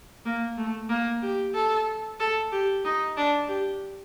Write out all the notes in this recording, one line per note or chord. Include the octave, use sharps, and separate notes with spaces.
A#3
A3
A#3
G4
A4
A4
G4
D#4
D4
G4